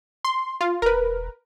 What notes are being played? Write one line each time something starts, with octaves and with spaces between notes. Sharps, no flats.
C6
F4
E1 A#4 B4